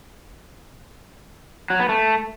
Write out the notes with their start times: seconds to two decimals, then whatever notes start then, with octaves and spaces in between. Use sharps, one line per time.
1.70 F#3
1.80 B3
1.89 A3